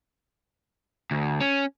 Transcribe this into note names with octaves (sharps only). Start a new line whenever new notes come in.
D2
C#4